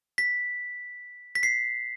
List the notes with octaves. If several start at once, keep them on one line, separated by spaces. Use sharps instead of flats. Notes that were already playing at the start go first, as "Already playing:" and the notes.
B6
B6
C7